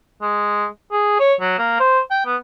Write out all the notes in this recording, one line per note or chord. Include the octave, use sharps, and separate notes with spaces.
G#3
G#4
C#5
F#3
A#3
C5
G5
B3